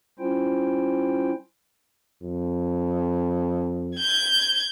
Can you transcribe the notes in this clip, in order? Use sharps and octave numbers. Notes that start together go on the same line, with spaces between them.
G3 C#4 E4 F4 C5 G5
F2
G6 G#6